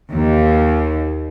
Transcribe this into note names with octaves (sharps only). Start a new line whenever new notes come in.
D#2